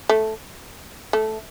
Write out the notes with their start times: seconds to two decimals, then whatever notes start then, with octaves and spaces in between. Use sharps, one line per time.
0.09 A3
1.13 A3